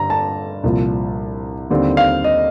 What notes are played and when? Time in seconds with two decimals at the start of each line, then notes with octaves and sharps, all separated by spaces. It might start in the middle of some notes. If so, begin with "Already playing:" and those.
Already playing: G2 D3 G3 A#5
0.10 A5
0.64 C2 A#2 F3
1.70 D#2 D3 G3 C4
1.97 F5
2.24 D#5